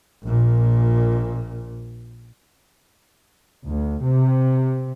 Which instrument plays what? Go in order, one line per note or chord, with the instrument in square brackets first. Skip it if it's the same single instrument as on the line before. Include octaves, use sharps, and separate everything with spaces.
[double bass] A#1 A#2
[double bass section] D2
C3